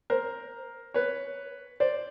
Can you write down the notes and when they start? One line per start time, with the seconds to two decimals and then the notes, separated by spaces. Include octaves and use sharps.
0.10 A#4 C5
0.94 B4 C#5
1.80 C5 D5